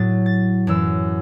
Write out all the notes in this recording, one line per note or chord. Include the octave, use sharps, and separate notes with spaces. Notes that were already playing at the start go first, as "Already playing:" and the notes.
Already playing: A2 F#3 A6
A6
F#2 E3 E6